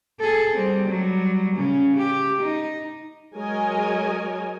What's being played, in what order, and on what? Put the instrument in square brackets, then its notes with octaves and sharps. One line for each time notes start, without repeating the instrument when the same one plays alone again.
[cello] G#4 A4
G3 C4
F#3 G3
C#3 C#4
G4
D#4
[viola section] F#3 G#3 A#4 C#5 D#5 G#5